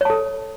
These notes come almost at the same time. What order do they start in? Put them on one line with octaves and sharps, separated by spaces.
C#5 A5 A4